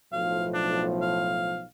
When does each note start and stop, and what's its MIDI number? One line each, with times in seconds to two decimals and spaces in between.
0.13 1.62 35
0.13 1.62 45
0.13 1.62 53
0.13 0.46 77
0.54 0.84 62
1.02 1.64 77